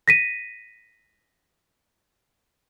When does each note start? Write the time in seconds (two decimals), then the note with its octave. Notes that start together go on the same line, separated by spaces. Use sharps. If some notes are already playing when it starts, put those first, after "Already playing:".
0.08 A#6 B6 D#7